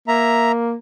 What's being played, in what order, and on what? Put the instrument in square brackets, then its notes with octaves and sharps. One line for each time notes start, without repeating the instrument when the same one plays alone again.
[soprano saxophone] A#3 [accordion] E5 A#5